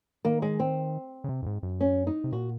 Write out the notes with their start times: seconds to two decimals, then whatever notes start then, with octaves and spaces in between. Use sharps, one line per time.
0.25 D#3 A#3
0.42 G#3
0.60 C4
1.24 C#3
1.29 C3
1.42 F#2
1.46 G#2
1.63 F#2
1.81 C#4
2.07 D#4
2.24 C3
2.33 A#2 F#4